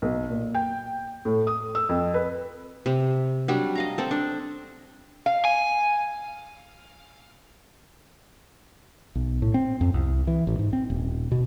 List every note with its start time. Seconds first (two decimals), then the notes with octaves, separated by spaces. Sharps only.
0.02 B1
0.30 A#2
0.54 G5
1.25 A2
1.47 D#6
1.75 E6
1.89 F2
2.14 B4
2.86 C3
3.48 F#3 G3 D4
3.75 D#5 F5 A#5
3.98 C4 A4
4.11 D4
5.26 F5
5.45 G#5
9.15 B1
9.42 A2
9.54 C4
9.81 F2
9.94 C2
10.27 E3
10.47 A1
10.59 G#2
10.73 C4
10.90 D#1
11.32 B2